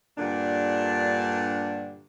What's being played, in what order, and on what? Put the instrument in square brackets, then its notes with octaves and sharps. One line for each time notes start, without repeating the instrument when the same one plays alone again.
[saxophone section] G2 A#2 D3 D4